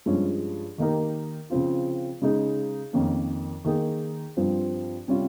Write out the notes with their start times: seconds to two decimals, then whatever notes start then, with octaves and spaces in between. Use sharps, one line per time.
0.06 G2 F3 G#3 C#4
0.78 D#3 A#3 D#4 G4 A#4
1.50 C#3 F3 C4 F4
2.22 C#3 G#3 D#4 G#4
2.93 F2 D#3 A#3 C#4
3.64 D#3 A#3 D#4 G#4
4.37 G2 F3 C4
5.08 C3 G3 C#4 F4